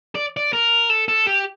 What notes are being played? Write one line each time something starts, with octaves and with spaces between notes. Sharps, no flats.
D5
D5
A#4
A4
A4
G4